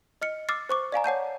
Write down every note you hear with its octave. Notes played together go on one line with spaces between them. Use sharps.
D#5 F6 C#7
D6 E6 F6 A6 C7
C5 C#6 D6
D5 F5 G#5 A#5
C#5 F#5 A5 G6